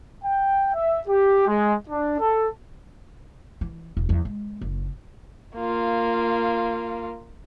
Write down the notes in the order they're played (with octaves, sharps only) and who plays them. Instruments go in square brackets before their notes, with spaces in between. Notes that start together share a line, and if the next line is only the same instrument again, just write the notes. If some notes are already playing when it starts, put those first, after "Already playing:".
[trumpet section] G5
E5
G4
G#3
D4
A4
[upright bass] E3
E1
E2 F3
G#3
F#1
[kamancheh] A#3 F4